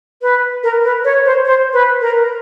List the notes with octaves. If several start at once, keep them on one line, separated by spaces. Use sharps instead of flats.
B4
A#4
B4
C#5
C5
C5
B4
A#4